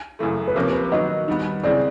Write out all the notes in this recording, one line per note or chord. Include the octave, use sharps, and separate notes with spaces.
F#2 C#3 E3 A3
B4
C3 F3 A#3 C#4 A#4
B4
D#3 F#3 B3 D#4 F#4 D#5
D#3 G3 B3
C#3 E3 G#3 C4 D5